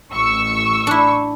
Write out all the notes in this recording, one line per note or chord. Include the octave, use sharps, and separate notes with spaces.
A1 C#6 E6
D4 E4